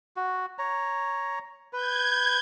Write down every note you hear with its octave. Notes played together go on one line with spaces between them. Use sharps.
F#4
C#5 A#5
B4 G6 G#6